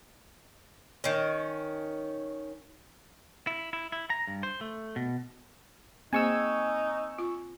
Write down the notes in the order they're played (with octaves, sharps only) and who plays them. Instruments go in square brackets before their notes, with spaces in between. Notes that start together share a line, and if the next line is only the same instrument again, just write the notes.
[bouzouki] D#3 C#4
[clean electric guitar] E4
E4
E4
A#5
G2
C5
A3
B2
[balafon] A#3 G#4 [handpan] C4 [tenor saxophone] D#4 [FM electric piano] G#5 C#6 E6
[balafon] F4